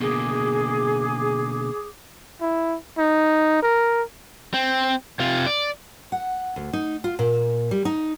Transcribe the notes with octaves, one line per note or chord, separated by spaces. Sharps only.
B2 D3 A#3 G#4 D6
E4
D#4
A#4
C4
C3 F4
D5
F#5
D2
D#4
F4
A#2
G3
D#4